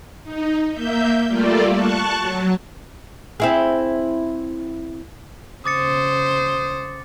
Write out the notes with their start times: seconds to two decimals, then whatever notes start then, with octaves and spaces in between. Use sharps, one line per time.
0.23 D#4
0.72 A#3 E5 G6
1.28 G3 A3 A#3 F4 A4 D5
1.71 A5 C#6 F#6
2.17 F#3
3.40 C4 E4 G#4
5.66 C#3 C5 D6 D#6 A6 C#7